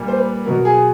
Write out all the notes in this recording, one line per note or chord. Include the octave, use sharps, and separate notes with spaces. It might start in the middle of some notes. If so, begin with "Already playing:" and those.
Already playing: A#2 G3
C5
B4
B2 F#3 A#4
G#4